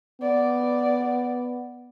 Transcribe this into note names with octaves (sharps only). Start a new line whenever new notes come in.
B3 D5